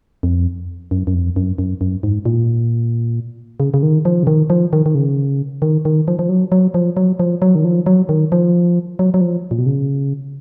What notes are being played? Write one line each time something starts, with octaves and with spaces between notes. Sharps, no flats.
F2
F#2
F#2
F2
F#2
F#2
F#2
G#2
A#2
C#3
C#3
D#3
F3
C#3
D#3
F3
D#3
D#3
C#3
D#3
D#3
F3
F3
F#3
F#3
F3
F#3
F3
F#3
D#3
F3
F#3
D#3
F3
F#3
F#3
F3
A#2
B2
C#3